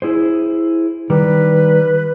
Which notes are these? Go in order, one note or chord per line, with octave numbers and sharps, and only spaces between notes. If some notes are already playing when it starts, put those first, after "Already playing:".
E4 G#4 C5
D#3 G3 B4